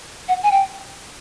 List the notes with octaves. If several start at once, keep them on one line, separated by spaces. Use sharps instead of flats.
F#5
G#5
G5